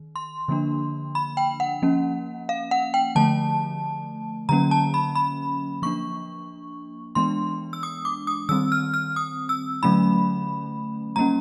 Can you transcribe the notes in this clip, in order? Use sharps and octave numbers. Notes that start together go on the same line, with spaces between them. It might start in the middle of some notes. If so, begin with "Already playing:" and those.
Already playing: D#3
C6
D3 F3 A#3 D4
B5
G5
F#5
F3 A#3 C#4
F5
F#5
G5
D3 F3 A3 A5
D3 F#3 A#3 C#4 A#5
A5
B5
B5
F3 A#3 D4 C#6
E3 G#3 B3 D4 C6
E6
D#6
D6
D#6
D#3 G3 C4 E6
F6
F6
D#6
E6
D3 F#3 A3 C#4 B5
G3 A#3 C#4 A#5